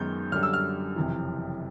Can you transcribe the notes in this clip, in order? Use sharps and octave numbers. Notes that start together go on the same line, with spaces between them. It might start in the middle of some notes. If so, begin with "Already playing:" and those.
Already playing: F#2 D#3 G#3 B3 D#4 G6
F#2 D3 G3 F6
E6
F6
F#1 F2 C3 E3